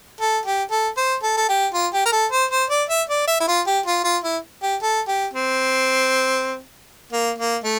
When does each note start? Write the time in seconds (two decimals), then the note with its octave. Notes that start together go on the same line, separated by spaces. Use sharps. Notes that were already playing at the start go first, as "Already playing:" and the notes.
0.21 A4
0.46 G4
0.71 A4
0.97 C5
1.23 A4
1.37 A4
1.49 G4
1.74 F4
1.93 G4
2.06 A#4
2.12 A4
2.32 C5
2.51 C5
2.70 D5
2.89 E5
3.09 D5
3.27 E5
3.41 E4
3.48 F4
3.67 G4
3.86 F4
4.04 F4
4.24 E4
4.63 G4
4.82 A4
5.08 G4
5.34 C4
7.13 A#3
7.38 A#3
7.64 A3